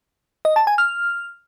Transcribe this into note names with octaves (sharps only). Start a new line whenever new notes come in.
D#5
A5
G#5
F6